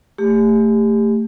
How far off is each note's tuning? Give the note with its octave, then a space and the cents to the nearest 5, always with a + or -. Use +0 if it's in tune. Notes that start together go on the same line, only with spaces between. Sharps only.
A3 +15 G4 +25